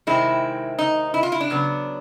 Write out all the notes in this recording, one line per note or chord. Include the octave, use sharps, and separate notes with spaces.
C3 D#3 G#3 C4 E4
D#4
E4
F4
E4
D4
C#3 F#3 B3